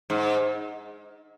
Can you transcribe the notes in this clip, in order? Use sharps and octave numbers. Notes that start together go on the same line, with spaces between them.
G#2